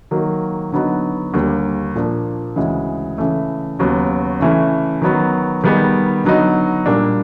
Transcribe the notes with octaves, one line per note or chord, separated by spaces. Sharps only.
D#3 F#3 A#3
D3 F#3 B3 D#4
D#2 D3 G3 A#3
A#2 F3 A#3 D4
D2 C#3 E3 G#3
C#3 E3 A3
D#2 C#3 F#3 B3
C#3 E3 A3 C#4
D#3 F#3 B3
D#3 G3 B3 D#4 G#4
D3 F#3 B3 D#4
A#2 G3 A#3 D4